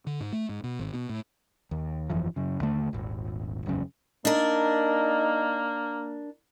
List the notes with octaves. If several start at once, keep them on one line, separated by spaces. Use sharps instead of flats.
D3
G#2
A3
G#2
B2
G#1
B2
A2
D#2
G1 F2 E3 F3
F#2 C#3
D#2 D3 A3
D#1 G#1
E1 B1 F#2 C#3
A#3 D4 D#4 A#4